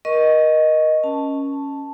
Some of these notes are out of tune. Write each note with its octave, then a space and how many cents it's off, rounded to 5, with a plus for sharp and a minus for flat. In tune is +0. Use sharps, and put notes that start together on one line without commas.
A#4 +30 D#5 +0 C#6 +0
C#4 +0 A5 +0